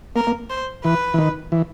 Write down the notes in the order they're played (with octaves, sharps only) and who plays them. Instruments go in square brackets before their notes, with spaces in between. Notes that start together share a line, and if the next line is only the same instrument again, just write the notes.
[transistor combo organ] A#3 [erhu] A#4
[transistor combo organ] A#3
[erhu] C5
[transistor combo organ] E3 [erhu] B4
[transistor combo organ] E3
D#3
E3